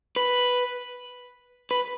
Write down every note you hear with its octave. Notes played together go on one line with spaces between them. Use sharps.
B4
B4